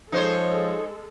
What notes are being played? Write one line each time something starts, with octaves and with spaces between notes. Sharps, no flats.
F3 G#3 D#4 A4 C5 C#5